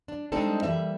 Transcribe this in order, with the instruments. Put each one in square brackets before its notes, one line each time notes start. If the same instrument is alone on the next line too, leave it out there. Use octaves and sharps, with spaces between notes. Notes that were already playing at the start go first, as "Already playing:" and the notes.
[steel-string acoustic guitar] D4
G3 G#3 C4 D4 D#4 A4
E3 G3 A#3 E5